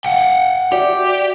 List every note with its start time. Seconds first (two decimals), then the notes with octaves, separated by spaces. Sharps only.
0.05 F#5 G5
0.72 F#4 G4 D5 E5